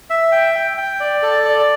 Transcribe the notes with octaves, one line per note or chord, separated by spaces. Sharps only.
E5
G5
G5
G5
D5
A4
D5